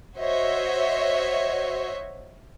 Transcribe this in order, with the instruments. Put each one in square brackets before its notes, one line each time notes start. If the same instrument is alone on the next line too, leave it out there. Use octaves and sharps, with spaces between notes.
[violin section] F#4 C5 C#5 D#5 E5